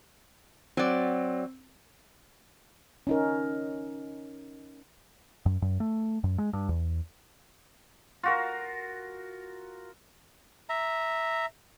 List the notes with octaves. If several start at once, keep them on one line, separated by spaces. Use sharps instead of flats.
F#3 C4 D5
C#4 D#4 A#4
F#2
F#2
A3
F#2
G#3
G2
E2
F4 F#4 A#4
E5 A#5